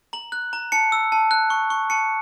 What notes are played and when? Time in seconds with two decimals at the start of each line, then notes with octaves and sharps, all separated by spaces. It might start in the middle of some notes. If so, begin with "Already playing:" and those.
0.13 A#5 F#7
0.32 F#6
0.53 A#5
0.72 A5 C#7
0.92 E6
1.12 A5
1.31 F#6
1.50 C#6
1.70 C#6
1.90 A5 C#7